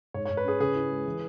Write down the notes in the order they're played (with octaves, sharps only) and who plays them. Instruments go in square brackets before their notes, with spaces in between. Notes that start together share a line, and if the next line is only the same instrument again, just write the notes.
[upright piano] G#2 [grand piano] C#5
[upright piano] G#2 [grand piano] C#5
[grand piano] B4
[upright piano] C#4 [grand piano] G#4
[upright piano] C#3 [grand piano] G#4
[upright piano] E4
G#3
E3